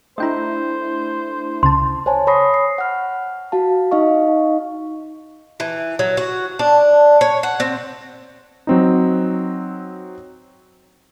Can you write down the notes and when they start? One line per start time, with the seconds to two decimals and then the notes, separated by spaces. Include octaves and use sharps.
0.18 A3 D4 E4 C5 D#5 G5 A#5
1.63 C#2 C#3 A5 C6
2.06 C5 C#5 G#5 A5
2.27 C#5 B5 C#6 D#6 A#6 C7
2.54 C7
2.78 F#5 F6
3.52 F#4 F5 A5
3.91 D#4 D#5 F5 C#6
5.60 E3
5.99 F#3
6.17 F#4
6.59 D4
7.21 C#5
7.43 F#5
7.60 C4
8.67 F#3 C4 D#4